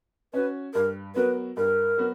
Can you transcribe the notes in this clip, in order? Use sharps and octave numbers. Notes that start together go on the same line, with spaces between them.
C#4 F#4 B4
G2 A#4
F#3 B3 F#4 A#4 B4
G2 A#4
F#3 B3 F#4